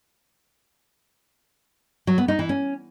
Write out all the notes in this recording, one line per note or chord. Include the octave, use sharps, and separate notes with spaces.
F#3
B3
D#4
E3
C#4